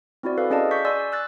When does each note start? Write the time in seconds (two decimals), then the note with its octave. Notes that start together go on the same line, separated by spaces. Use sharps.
0.23 C4 E4 F#4 D5
0.38 A4 B4 D5 F5
0.50 C#4 G#4 D5 D#5 F5 A5
0.71 C#6 G6 B6
0.85 D5 G#5 C6 E6
1.12 E6 F#6 A6